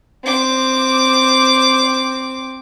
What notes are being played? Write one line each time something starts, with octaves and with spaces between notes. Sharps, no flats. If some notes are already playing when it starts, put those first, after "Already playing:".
C4 D6